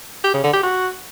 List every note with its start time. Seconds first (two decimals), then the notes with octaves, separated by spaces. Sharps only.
0.24 G4
0.34 C#3
0.44 D3
0.53 G4
0.63 F#4